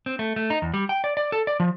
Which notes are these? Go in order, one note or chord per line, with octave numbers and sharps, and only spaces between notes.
C4
A3
A3
D#4
E2
G3
G5
D5
D5
A4
D5
F3